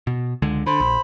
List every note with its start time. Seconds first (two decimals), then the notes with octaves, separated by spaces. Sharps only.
0.07 B2
0.42 C#2 D3 G#3
0.66 D3 C5 B5
0.80 A#1